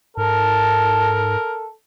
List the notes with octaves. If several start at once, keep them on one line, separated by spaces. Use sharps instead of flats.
G#2 A4 A#4 A5